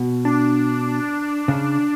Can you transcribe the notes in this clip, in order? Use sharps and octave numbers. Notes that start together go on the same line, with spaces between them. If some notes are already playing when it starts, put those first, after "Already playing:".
Already playing: B2
D4
C#3